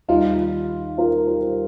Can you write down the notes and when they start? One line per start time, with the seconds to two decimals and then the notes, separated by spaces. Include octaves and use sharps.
0.09 D#2 D#3 G3 D#4 F4
0.98 F4 A#4
1.27 G4 C5